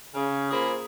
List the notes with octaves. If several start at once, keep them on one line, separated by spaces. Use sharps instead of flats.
C#3
A#3 F4 G#4 C5 B5